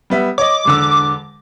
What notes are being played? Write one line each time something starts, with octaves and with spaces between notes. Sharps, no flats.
G3 B3 E5
C#5 D#5 D6
E1 D3 E6